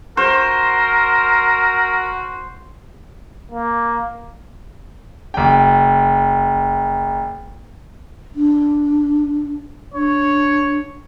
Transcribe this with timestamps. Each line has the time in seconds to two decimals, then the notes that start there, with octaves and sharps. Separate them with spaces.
0.17 F#4 A#4 C5
3.51 A#3
5.34 F#1 G5
8.35 D4
9.94 D4 C#5